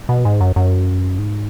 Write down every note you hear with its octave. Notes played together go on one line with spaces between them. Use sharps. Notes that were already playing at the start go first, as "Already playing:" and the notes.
B2
G#2
F#2
F#2
G#2